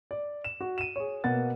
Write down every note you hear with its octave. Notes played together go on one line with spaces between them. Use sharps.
D5
E7
F#4
D#7 E7
G#4 C#5
B2 A#3 F#5 A6